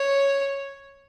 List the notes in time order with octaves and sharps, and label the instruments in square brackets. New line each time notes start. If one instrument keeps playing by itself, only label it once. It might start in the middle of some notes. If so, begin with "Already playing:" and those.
Already playing: [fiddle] C#5